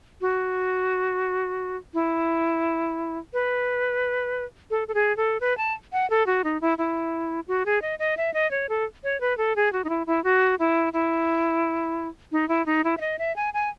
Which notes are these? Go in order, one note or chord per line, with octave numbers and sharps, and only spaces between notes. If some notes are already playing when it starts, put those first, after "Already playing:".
F#4
E4
B4
A4
A4
G#4
A4
B4
A5
F#5
A4
F#4
D#4
E4
E4
F#4
G#4
D#5
D#5
E5
D#5
C#5
A4
C#5
B4
A4
G#4
F#4
D#4
E4
E4
F#4
E4
E4
D#4
E4
D#4
E4
E5
D#5
E5
G#5
G#5